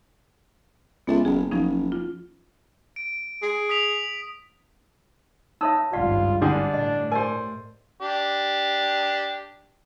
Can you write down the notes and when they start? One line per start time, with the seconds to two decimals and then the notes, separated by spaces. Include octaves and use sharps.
1.07 C#2 B3 A4 E5
1.25 F#1 G#4
1.51 F#1 F3 C#4 D#4
1.92 F4
2.96 D7
3.42 G#4
3.69 D#6 B6 F7
5.61 D#4 C#5 E5 D#6 E6
5.93 G#1 C#2 G2 F4 D5 F5 F#5
6.42 D3 G3 D4 G#4
6.74 A2 D#5
7.12 G4 A#4 C5 D5 G#5
8.01 D4 G4